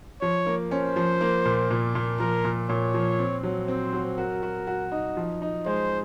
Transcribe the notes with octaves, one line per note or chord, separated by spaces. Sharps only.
F3 C#5
A#3
C#4 C5
F3
A#3
A#2
A#2
A#2
F3 A#4
A#2
A#2 C#5
F3
C4
F#3
C4 C5
F#3
F#4 A#4
F#4
F#4
D#4
F3
D#4
G#3 C5